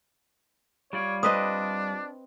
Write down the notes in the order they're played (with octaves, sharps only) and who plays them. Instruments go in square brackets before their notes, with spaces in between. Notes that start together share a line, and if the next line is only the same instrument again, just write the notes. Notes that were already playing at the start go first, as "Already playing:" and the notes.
[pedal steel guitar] G3 F4 D5 [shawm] C#5
[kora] C4 B4 D#5 [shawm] D4 [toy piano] D#6